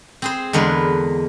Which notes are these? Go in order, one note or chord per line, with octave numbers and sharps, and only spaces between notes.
C4 G#4 C5
E2 D3 G#3 A#4 B4